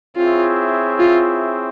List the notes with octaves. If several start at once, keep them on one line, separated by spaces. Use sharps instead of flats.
C4 E4 F4 G#4 C#5 E5
F4